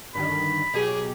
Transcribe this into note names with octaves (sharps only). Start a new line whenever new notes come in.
G2 D3 D#3 B5
B2 F#3 G4 G#4